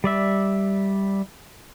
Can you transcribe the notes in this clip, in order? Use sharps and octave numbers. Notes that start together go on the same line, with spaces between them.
G3 D5 E5